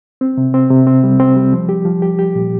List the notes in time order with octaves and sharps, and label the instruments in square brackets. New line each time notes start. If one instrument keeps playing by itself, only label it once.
[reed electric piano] C4
C3
C4
C3
C4
G3
C4
G3
F3
G4
F3
G4
G4
A#2